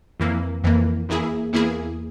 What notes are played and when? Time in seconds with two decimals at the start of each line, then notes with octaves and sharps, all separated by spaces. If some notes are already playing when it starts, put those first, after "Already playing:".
0.20 F2 E3 A#3
0.64 F2 E3 A#3
1.09 E2 E3 A#3 E4 G#4
1.53 E2 E3 A#3 E4 G#4